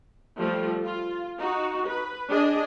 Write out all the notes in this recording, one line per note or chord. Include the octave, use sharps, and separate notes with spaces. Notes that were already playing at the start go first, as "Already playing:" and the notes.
F3 G3 A3 F4
F4
D#4 F#4
B4
D4 G#4 D#5